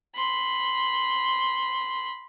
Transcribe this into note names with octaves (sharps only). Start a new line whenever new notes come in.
B5 C6